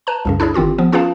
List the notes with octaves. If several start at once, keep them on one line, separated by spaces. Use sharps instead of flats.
B4 A5 A#5
C2 F#2 C#3
D4 E4 G#4 C#5
G1 D#3 C4 F4 G4
F3 B3
C#4 F4 G#4 B4 F5 A5